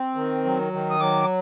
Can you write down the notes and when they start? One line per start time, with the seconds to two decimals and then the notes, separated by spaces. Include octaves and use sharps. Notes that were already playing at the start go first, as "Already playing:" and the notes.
Already playing: C4
0.15 D#3
0.44 F#3
0.73 D#3
0.90 D#6
1.00 F#3 D6